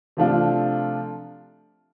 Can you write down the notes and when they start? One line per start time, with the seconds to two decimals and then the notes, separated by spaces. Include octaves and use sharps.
0.17 C3 F3 A3 D4 F4